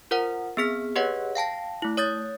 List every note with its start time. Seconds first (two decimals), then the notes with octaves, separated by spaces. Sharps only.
0.11 F4 A#4 C5 F#5
0.57 B3 C4 G#4 F6 B6
0.96 G4 G#4 B4 C#5 D#5 F#5
1.35 F5 G5 A5 A#6
1.82 A3 E4
1.97 C#5 D#6 G6 A6